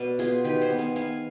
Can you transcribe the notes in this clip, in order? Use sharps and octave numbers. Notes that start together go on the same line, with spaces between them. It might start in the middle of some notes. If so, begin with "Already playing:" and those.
Already playing: B2 B4 D5 F5
B3 F4 G#4
D#3 G4 B4
G#4 C5
B3
F5 G#5
B3 F5 G#5